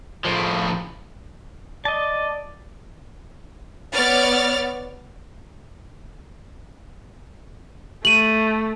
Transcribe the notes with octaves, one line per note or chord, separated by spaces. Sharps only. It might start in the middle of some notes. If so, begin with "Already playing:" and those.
A2 F3
D5 D#5 A5
B3 C#5 D5 F6 A6
A3 D#7 F#7